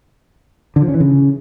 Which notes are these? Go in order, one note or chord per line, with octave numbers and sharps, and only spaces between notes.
D3
F3
C#4
E3
C#3